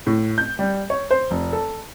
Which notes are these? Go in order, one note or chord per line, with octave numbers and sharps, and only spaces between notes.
A2
G6
G3
C#5
C5
F1
A4